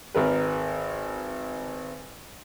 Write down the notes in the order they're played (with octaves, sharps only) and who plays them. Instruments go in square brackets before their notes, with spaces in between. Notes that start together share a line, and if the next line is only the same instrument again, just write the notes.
[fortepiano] G#1 A#4 B4